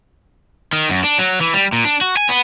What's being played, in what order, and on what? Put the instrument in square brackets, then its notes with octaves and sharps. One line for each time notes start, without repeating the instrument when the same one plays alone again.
[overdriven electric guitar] D#3
F#2
D4
F#3
E3
G3
A#2
D4
F#4
G#5
B3